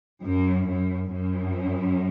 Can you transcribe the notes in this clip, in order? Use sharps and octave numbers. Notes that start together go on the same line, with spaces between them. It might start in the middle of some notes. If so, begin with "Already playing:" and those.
F#2
F#2
F#2